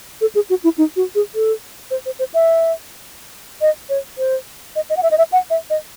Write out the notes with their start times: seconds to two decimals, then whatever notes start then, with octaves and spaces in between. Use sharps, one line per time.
0.21 A4
0.35 G#4
0.50 F#4
0.64 E4
0.78 D#4
0.96 F#4
1.15 G#4
1.35 A4
1.91 C5
2.06 C5
2.19 C5
2.34 E5
3.61 D#5
3.89 C#5
4.18 C5
4.76 D#5
4.90 D#5
4.97 F#5
5.03 E5
5.11 D#5
5.18 E5
5.32 F#5
5.50 E5
5.70 D#5